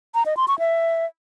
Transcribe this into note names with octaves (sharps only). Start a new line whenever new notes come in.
A#5
D#5
C6
C#6
E5